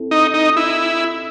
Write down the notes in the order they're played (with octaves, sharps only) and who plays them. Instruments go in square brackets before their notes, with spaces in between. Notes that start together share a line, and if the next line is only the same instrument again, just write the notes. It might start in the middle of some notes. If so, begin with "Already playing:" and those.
Already playing: [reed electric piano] C4 E4 A4
[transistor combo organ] D#4
D#4
E4